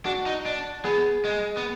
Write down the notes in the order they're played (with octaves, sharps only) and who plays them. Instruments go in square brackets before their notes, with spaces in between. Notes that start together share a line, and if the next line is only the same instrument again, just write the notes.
[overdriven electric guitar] D4 [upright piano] F#4
[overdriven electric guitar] D#4
D4
[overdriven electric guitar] B3 [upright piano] G#4
[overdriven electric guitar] G#3
B3